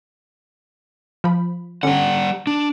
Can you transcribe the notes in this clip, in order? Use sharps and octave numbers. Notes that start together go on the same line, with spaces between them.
F3 B5
D3 G3 C#4 F#5
D4